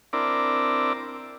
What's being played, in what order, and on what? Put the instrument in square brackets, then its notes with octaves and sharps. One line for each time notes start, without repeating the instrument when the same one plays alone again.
[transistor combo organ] C4 D4 E4 A#4 D5